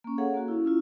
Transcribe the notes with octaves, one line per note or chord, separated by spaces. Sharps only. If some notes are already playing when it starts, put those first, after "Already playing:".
A#3 C#4
G#4 A4 C#5 F5 F#5
A#3 F#4
C#4 E4
C#4 E4 F4